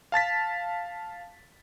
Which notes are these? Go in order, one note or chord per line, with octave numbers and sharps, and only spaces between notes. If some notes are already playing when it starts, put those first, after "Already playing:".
F5 A5 A6 B6